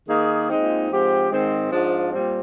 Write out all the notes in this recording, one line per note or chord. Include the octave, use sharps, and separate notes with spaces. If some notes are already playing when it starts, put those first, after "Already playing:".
D#3 A#3 D#4 G#4
A#2 G#3 C4 D#4
G#2 F3 C4 G4
G#2 D#3 G#3 C4
G#2 F3 G#3 D4 F4
A#2 G3 C4